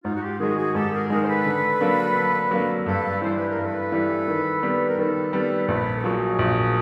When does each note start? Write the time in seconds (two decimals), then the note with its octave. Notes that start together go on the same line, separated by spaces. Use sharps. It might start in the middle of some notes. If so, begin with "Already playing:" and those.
0.05 G#2 D#4 F4
0.15 F#4
0.22 F4 G4
0.40 D#3 G#3 F#4 G#4
0.57 F#4 G#4
0.75 G#2 G4 A4
0.93 G#4 A#4
1.10 D#3 G#3 G#4 A#4
1.23 C5
1.28 A4 B4
1.45 D3
1.81 F#3 A#3 D4
2.16 D3
2.51 F#3 A#3 D4
2.86 G2 A4 B4
3.22 E3 G3 C5
3.36 B4
3.50 A#4
3.57 G2
3.63 A4 B4
3.92 E3 G3
4.28 D#3
4.63 G3 B3
4.88 A#4
4.98 D#3 A4 B4
5.33 G3 B3 A4 B4
5.68 A#1 A4 B4
5.98 A4
6.04 A#2 F#3 F#4 G#4
6.39 A#1